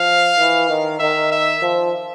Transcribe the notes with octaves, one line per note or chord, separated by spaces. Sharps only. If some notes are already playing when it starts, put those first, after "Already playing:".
Already playing: F3 F5
E3
D#3
D#3 E5
E5
F3